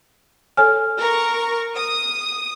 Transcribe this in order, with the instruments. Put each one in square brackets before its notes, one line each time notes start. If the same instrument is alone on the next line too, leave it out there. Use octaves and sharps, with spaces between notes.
[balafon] A4 C#5 G#5 [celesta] F6
[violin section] A#4 C#6
D#6